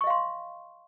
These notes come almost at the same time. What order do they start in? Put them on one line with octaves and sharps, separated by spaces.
C#6 D#5 F5 C6